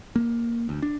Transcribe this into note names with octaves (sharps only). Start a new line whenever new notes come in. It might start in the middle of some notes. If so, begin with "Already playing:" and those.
A#3
D2
D4